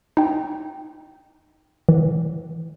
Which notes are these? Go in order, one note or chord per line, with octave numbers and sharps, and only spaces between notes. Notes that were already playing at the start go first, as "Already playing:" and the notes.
D#4 G5
E3